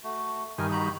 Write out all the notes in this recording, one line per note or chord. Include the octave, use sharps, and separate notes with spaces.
A3 F#4
G2 D#3 A#4 G#5
F#4 A#5 B5